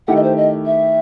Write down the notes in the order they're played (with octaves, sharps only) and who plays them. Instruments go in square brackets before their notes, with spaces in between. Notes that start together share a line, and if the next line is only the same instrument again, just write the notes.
[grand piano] D#3 A3 E4 G4 [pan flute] F#5
[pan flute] D#5
C5
D#5
E5